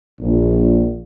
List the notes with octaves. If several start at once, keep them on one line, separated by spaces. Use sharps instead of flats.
A#1